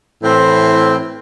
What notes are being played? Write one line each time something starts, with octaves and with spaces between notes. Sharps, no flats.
A2 E3 C4